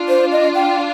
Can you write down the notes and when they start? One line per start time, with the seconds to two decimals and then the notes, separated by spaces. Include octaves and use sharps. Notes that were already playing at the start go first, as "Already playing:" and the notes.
Already playing: D4 F4
0.09 C5
0.32 D#5
0.55 G5